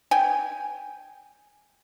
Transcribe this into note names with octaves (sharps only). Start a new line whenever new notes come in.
G5 G#5